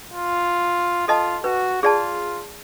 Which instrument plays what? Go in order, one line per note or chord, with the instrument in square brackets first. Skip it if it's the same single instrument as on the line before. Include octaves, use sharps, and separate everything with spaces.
[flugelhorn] F4
[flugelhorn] F4 [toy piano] A4 D#5 A5
[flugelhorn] F#4 [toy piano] B4
[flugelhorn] F4 [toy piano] G#4 D5 A5